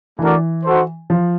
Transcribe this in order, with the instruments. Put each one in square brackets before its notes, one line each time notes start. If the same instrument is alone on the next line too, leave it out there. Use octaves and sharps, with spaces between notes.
[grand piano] E3 [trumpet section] A3 D4 F#4 A#4 D5
[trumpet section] D#4 F#4 A4 C5
[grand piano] F3